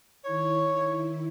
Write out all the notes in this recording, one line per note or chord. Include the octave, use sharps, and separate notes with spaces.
D#3 E4 C#5